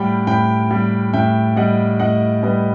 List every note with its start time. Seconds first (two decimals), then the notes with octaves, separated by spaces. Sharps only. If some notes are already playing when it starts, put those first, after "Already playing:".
Already playing: A2 G3 F#5 G5 B5
0.27 A2 G5 B5
0.71 G3
1.13 A2 E5 G5
1.56 G3 D#5 F#5
1.99 A2 D#5 F#5
2.43 G3 B4 D#5